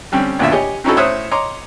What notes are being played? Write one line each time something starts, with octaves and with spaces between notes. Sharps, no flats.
D3 G3 C4 C#4
A#1 D#2 B2 F4 E5
G4 C#5 D#5 G#5
C4 C#4 D#4 E4 F#4 A4
A2 C5 C#5 E5 D#6 F#6
C#5 D#5 A#5 C6 D6